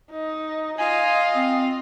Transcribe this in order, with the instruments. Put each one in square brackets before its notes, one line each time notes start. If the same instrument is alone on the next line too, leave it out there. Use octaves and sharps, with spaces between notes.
[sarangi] D#4
[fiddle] F4 [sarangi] D#5 [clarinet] G#5
[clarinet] C4